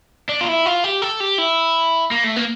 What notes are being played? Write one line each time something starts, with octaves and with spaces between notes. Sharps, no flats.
D4
F4
E4
F4
G4
A4
G4
E4
A#3
A3
A#3